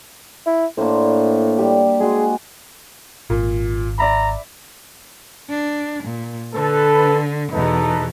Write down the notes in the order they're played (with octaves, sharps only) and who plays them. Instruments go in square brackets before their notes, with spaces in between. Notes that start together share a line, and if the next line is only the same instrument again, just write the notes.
[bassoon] E4
[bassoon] A2 [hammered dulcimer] A#3 D4 C5
[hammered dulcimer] G3 G4
[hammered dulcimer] G#3 F#4 [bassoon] G#4
[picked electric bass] G#1 [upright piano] A#2
[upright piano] D5 E5 B5 [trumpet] A#5
[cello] D4
A#2
[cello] D3 [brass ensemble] A4 B4
[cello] E2 B2 [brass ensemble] D#4 A4 B4